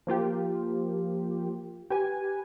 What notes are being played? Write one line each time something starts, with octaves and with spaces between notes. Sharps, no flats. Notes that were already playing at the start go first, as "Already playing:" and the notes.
F3 A#3 F4 G4
G4 B4 G#5